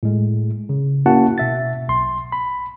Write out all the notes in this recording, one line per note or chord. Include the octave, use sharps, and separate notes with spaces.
A2 G#3
C#3
A#3 C#4 E4 F#4 F#5 A5
B2 E5 A6
B1 C6
B5